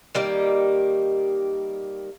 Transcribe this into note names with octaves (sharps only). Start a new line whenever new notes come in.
D#3 G3 A#3